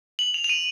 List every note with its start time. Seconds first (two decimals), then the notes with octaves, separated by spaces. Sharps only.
0.19 F#7
0.34 F7
0.44 F7
0.49 D#7